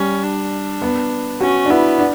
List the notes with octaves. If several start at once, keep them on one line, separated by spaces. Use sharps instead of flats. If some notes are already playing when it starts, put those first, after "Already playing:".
Already playing: G3 C#4
D4
B3
C#4 F#4
D4
B3 E4
D4